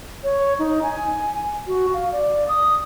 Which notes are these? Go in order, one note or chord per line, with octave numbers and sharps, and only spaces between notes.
C#5
D#4
G#5
F#4
F5
D5
D#6